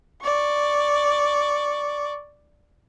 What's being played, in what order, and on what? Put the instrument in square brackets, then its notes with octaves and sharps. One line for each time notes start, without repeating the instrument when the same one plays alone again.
[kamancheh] D5 C#6